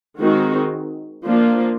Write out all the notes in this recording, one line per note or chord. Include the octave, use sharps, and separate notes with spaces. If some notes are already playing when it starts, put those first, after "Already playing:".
D#3 G#3 C4 D#4 F#4
F3 A#3 D4 F4